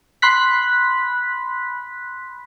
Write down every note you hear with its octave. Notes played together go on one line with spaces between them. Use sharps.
B5 C6 F#6 B6